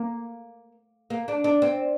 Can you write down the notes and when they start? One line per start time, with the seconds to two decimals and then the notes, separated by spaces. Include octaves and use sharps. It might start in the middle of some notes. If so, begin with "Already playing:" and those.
Already playing: A#3
1.10 A#3
1.28 D4
1.44 D4
1.62 C4